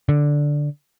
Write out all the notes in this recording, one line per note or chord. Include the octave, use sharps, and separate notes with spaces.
D3